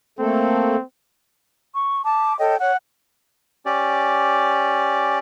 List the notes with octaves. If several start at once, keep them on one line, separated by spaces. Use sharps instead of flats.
A3 A#3 C4 A4
C#6
A5 D6
A4 C#5 D#5 G5
C#5 F#5
C#4 G4 D5